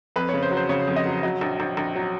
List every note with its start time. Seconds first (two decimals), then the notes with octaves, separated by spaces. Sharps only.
0.16 F2 B4
0.29 C#3 C#5
0.43 C5
0.51 F#3
0.57 C5
0.69 C#3 C#5
0.87 F2
0.96 D#5
1.06 F#3
1.23 F#3 D#5
1.41 A#1
1.60 A#1
1.77 A#1
1.95 F#3